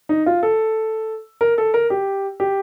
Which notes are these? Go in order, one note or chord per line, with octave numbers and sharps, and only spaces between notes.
D#4
F4
A4
A#4
A4
A#4
G4
G4